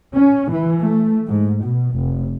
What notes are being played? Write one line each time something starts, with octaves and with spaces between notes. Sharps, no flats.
C#4
E3
A3
G#2
B2
F1